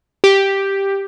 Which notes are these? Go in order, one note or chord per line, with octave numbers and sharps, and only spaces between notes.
G4